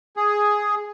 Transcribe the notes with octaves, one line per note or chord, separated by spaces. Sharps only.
G#4